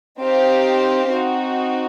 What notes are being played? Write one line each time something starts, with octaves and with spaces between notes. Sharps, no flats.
C4 D#4 G4 C5 F5
C4 D#4 F#4